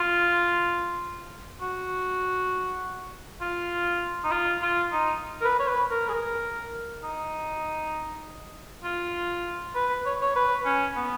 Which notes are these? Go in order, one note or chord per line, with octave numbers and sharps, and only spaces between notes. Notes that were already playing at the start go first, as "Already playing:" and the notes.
Already playing: F4
F#4
F4
D#4
F4
F4
D#4
A#4
B4
C#5
B4
A#4
G#4
A#4
D#4
F4
B4
C#5
C#5
B4
C#4
B3